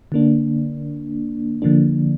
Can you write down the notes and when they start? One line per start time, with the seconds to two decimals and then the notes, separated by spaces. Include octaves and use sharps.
0.12 D3 A#3 D4
1.62 D3 F3 A#3 D4